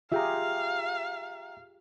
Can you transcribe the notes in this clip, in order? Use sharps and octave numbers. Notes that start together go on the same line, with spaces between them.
F4 G4 G#4 E5 F5 G5 A#5